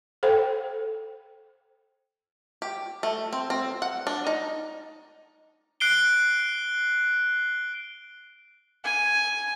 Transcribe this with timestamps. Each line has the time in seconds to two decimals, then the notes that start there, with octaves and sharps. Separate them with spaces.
0.23 A4 C5 G5
2.62 G4
3.03 A3
3.33 C4
3.50 C4
3.82 F#5
4.07 D4
4.27 D#4
5.80 F#6 C7 D7 G7
8.85 G#5